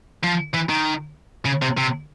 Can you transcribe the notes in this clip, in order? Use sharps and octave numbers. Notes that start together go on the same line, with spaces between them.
F3
E3
D#3
C#3
C3
C3